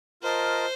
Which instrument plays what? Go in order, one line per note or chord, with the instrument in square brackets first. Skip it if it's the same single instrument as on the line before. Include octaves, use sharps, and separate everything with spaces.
[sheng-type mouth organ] F4 A#4 D#5 A5 [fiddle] C5